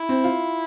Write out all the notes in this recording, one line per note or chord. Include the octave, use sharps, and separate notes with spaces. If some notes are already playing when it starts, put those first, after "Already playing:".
Already playing: E4
C4
F4